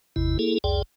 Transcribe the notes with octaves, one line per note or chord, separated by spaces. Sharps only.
G#1 E2 C3 E4
A#3 E4 G#4 A4
C2 F2 G#4 D5 G5